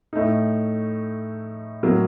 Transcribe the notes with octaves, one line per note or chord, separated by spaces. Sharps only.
A2 A3 D#4
A2 F#3 A#3